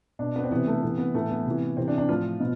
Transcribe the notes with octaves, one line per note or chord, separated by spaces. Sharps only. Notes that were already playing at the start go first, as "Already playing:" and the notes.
B2 D4
B3
C4
C3 E3 B3
A3
C3 E3 B3
B3
A2 E3 A3
B3
C3 E3
C3 E3 C4
D4
D4
A2 F3 F4
B2